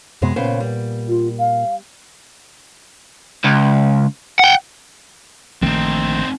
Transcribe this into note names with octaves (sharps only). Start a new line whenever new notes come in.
F#2 C3 G#3 B3
A#2 C#3 B3 C5
G3
F4
F5
C#2
F#5 G5
A#1 D#3 A3 C4 D#4